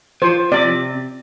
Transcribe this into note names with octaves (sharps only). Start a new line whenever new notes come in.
F3 C5
C3 D5